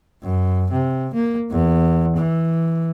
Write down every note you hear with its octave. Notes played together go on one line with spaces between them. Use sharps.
F#2
C3
A#3
E2
E3